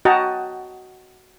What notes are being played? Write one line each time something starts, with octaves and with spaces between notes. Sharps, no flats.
F#4 D#5 F#5 G5 A5 A#5